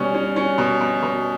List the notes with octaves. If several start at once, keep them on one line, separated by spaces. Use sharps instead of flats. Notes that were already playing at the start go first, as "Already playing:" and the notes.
Already playing: B2 G3 C#4
C#4
C#4
B2
B2
B2